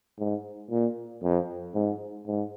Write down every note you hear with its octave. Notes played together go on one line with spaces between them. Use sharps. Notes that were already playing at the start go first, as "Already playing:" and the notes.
G#2
A#2
F2
G#2
G#2